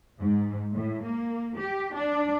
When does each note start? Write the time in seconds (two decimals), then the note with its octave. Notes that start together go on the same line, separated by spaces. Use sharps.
0.20 G#2
0.74 A2
1.05 A#3
1.59 G4
1.96 D4